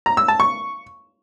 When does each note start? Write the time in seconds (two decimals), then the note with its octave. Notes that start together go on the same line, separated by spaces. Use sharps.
0.06 A#5
0.17 E6
0.28 A5
0.40 C#6